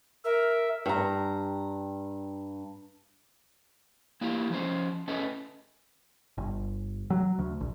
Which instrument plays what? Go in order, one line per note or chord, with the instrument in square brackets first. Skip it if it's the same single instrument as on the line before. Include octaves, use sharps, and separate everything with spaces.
[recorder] A#4 [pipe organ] E5
[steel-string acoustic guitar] G2 A#5
[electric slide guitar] A#3 E4 F4 G4
F3 C#4 C5
C#4 A4 B4 D#5
[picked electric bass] G1
F#3
D2
A#1